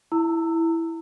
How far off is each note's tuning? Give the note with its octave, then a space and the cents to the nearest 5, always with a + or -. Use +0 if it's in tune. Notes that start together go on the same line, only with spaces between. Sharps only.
E4 +0 A#5 -35 E6 +0